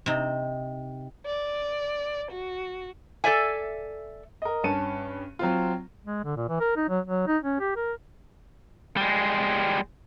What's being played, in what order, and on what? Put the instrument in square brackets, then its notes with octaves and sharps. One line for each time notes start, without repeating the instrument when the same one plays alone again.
[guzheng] C3 D#4
[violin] D5
F#4
[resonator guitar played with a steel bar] A4 C5 D5 E5 G#5
[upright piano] A#4 D#5
G2 C#4 A5 C#7 D#7
F#3 C4 F4
[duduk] G#3
D3
A#2
E3
A#4
D#4
F#3
F#3
D#4
C#4
G4
A#4
[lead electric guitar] G3 G#3